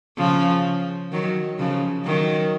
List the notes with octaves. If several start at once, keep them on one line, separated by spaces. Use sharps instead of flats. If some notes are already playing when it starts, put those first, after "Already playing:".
C#3 F3
D#3 F#3
C#3 F3
D#3 F#3